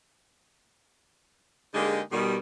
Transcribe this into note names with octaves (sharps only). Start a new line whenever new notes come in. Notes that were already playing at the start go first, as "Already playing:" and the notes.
D3 G#3 A#3 D#4 G4 G#4
B2 D#3 G3